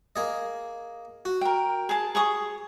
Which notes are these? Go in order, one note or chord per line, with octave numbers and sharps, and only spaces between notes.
A#3 G#4 D#5
F#4
A#4 G5
G#4 A5
G#4 C#6 D#6